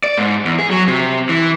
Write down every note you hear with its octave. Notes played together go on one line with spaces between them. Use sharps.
D5
G#2
E2
G#4
F#3
C3
E3